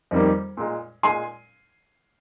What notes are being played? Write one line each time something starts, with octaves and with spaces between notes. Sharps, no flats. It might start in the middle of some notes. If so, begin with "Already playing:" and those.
F2 D#3 G3 A#3
A#2 G#3
A#2 G#3 G#5 C6